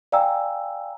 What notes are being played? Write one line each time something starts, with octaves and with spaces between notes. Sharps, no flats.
D5 F5 G5 G#5 A#5 E6